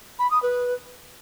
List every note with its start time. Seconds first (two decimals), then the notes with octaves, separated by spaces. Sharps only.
0.19 B5
0.31 D#6
0.43 B4